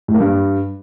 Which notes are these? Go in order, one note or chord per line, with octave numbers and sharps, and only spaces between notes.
A2
A#3
G2